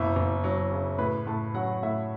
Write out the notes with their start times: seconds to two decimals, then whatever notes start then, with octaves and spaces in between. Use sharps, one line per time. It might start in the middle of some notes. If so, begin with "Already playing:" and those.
Already playing: F#1 B2 E4
0.16 F#1
0.44 F#3
0.72 C#3
0.99 A2 B4
1.27 A2 A5
1.54 F#3 F#5
1.83 A2 E5